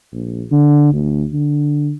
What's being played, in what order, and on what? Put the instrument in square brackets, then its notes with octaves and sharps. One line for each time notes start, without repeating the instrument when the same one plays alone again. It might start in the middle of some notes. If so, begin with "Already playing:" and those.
[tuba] A#1
D3
D2
D3